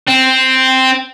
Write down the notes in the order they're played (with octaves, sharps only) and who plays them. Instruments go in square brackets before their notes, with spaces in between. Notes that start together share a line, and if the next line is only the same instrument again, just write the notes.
[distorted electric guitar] C4